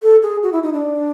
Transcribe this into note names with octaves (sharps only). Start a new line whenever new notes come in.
A4
G#4
F#4
E4
D#4
D4